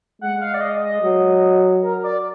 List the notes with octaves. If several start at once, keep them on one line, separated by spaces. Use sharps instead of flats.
G#3 F#5
F5
D5
D#5
D#5
F#3
A#4
D5